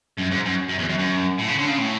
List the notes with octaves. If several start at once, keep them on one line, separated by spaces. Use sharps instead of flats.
F#2
G#2
F#2
F#2
E2
F#2
F#2
A2
C#3
D3
C#3
A2